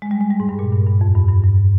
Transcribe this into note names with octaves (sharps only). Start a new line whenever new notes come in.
G#3
G3
G#3
G3
G#2
G2
A#2
G2
G2
F2
G2
G2
G2